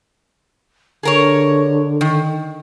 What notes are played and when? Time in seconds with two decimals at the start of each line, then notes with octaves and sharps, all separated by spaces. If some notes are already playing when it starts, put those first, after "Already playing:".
1.03 D3 G#4 A#4 C#5
2.01 D#3